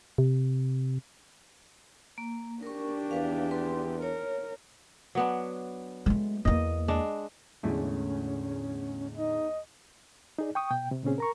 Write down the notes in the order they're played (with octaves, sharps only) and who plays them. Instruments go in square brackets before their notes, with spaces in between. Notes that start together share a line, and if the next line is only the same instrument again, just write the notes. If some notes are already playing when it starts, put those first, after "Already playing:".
[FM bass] C3
[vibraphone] A#3
[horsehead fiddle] D4 G4 [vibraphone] A#4 C#6
[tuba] E2 [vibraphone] B4 F5
[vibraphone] B4 C6
[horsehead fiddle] A#4 [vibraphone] C#5
[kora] F#3 B3 D4
[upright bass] G#3 A3
[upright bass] E2 A#3 [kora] D#5
[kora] G#3 D4
[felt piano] E2 G#3 [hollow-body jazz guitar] A2 D3 A3 [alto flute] C#4
[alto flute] D#4 [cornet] D#5
[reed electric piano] D#4 G#4 D5
G5 C#6 D#6
B2 G5
C3
A#2 C#3 C4 C#4 G#4
A#4 A#5 C#6